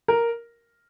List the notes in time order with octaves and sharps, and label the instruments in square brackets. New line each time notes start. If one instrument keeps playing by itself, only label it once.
[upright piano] A#4